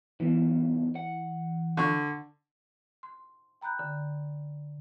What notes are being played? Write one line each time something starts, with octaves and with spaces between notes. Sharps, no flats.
C2 B2 E3
F#5
D3 C#6
C6
G5 A#5 B5 F#6 G6
D3